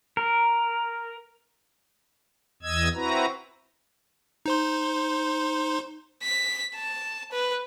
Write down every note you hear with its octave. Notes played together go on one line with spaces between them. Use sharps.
A#4
E2 D#5 E6 G#6
C4 E4 F#4 B4 A#5
D#4 C5 C6
B6
A5
B4